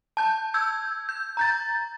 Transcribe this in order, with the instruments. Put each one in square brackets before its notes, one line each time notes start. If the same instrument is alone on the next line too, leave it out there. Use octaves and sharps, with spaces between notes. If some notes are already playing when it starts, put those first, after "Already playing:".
[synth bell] A5 G6
E6 G6 G#6
G6
A#5 G6 A6